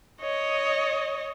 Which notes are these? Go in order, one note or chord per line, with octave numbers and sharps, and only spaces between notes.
C#5 D#5